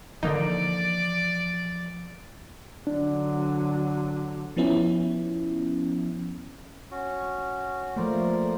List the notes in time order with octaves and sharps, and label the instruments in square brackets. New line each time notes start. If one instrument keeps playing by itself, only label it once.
[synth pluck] D3 A#3 D#4 [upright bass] E3 F3 [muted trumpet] D5
[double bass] D3 F#3 [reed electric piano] D4
[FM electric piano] F3 B3 C#4 E4
[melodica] C#4 F#4
[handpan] F3 A3 A#3 [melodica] A#4 C5 D5